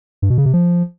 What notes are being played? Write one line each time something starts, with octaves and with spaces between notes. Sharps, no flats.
G2
B2
C#3
C3
F3